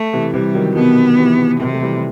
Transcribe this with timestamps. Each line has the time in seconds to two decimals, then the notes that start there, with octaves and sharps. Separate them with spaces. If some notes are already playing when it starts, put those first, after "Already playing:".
Already playing: A3
0.13 C3 E3
0.34 C3 E3 G3
0.55 D#3 F#3
0.76 B2 D#3 B3
1.18 C3 E3
1.60 C3 D#3 F#3
1.73 A3
1.81 E3 G3